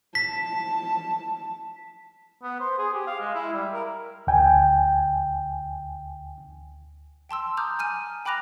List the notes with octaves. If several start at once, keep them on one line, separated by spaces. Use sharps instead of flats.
A5 B6
B3
C5
G#4
G4
F5
G#3
E4
G3
A#4
D2 G5 G#5
G5 A5 C6 E6
A#5 D6 D#6 F6 G6
G#5 F6 D#7
G5 B5 D6 F#6 A#6 F7